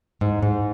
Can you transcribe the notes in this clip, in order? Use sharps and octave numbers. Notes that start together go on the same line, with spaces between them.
G#2
G#2